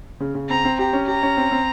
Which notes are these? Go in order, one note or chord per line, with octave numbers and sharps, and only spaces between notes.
C#3
C#3
C4 A#5
C4
G4 A#5
C#4
G4 A#5
C#4
C4
C4